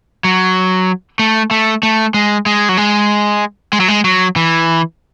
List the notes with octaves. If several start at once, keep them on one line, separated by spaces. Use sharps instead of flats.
F#3
A3
A3
A3
G#3
G#3
F#3
G#3
G#3
F#3
G#3
F#3
E3